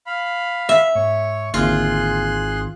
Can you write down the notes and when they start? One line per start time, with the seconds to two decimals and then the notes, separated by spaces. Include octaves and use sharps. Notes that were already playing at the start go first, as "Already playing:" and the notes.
0.06 F5 B5
0.69 E5
0.95 G#2 C#5
1.54 G#1 D#2 D3 A#3 F4 G#4 C6 F#6